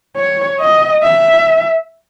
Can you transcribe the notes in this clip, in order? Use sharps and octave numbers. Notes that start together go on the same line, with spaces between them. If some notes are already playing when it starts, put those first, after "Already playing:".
C#5
D#5
E5